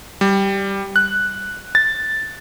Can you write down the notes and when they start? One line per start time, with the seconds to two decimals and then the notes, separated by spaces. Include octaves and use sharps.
0.21 G3
0.96 F#6
1.75 A6